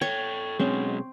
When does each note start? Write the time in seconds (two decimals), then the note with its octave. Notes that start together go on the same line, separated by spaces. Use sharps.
0.01 A4 C#5 G5
0.60 B2 F#3 G#3 C4 C#4